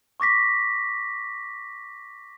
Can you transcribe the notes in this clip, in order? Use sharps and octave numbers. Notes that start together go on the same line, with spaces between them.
C#6 D6 A#6 B6